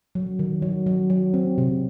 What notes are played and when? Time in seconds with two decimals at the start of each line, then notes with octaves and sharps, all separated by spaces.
0.15 F#3
0.39 D#3
0.62 F#3
0.86 F#3
1.10 F#3
1.34 C4
1.58 C3